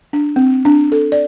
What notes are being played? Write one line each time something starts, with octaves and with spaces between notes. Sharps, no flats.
D4
C4
D4
A4
D5